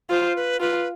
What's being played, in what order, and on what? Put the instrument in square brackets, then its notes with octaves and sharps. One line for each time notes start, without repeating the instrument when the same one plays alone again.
[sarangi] F4 [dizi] C5
[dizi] B4
[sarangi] F4 [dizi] B4